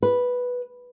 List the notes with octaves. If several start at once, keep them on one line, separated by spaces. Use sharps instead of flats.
B4